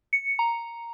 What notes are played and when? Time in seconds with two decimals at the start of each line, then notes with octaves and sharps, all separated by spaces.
0.13 C#7
0.39 A#5